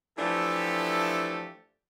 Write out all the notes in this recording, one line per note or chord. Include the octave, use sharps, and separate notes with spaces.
E3 F3 A3 D4 G4 A4